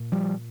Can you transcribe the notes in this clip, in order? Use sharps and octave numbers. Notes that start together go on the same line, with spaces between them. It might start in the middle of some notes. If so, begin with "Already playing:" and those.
Already playing: A#2
F3 G3